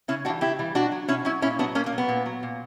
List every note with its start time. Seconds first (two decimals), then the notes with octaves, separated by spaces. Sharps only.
0.08 C#3 C#4 E4
0.25 G3 D4 F#4
0.28 E3
0.41 C#3 E4 G4
0.59 E3 G3
0.75 B2 D4 F#4
0.92 F#3
1.08 B2 C#4 E4
1.25 F#3 C#4 E4
1.42 A#2 C#4 E4
1.59 F#3 B3 D4
1.75 A#2 A#3 C#4
1.86 A#3
1.93 F#3
1.98 B3
2.09 A#2
2.26 F#3
2.43 A#2